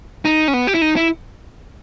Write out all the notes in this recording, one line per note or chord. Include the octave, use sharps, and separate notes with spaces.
D#4
C#4
B3
G4
E4
D#4
E4